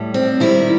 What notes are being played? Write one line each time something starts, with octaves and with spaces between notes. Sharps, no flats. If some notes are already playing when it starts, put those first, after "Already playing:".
Already playing: A2 G3
C4
D#3 G3 E4